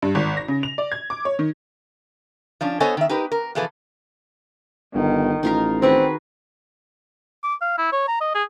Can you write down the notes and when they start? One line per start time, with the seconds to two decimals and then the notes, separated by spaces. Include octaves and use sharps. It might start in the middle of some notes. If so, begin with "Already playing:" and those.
0.02 G2
0.15 G#1
0.37 A#6
0.48 C#3
0.63 F7
0.78 D5
0.92 G#6
1.10 D6
1.25 C#5
1.39 D#3
2.61 F3 C#4 D4
2.80 B3 A4 C5 C#5 D#5 G#5
2.97 D#3 E5
3.09 D#4 G4 A#4 B4
3.32 A#4
3.55 B2 E3 F3 G#4 A4 B4
4.94 G1 D#3
5.43 A1 D#4 F4 A#4
5.82 D#3 C4 F#4 G#4 B4
7.43 D6
7.61 F5
7.78 E4
7.92 C#5
8.08 A#5
8.21 D#5
8.35 G#4